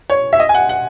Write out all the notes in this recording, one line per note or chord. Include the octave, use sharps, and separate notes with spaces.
C#5
E5
D#5
G#5
F#5
F#5